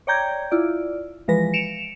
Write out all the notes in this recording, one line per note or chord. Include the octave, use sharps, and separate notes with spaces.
C#5 D5 G5 A#5 G6 G#6
E4 F4 D5
E3 F3 G#3 B4 A#6
C#7 D7 E7 F7